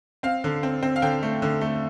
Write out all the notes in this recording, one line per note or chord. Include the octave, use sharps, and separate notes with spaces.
C4 F5
D3
C4
C4
F5
D3 G5
A3
D3
A3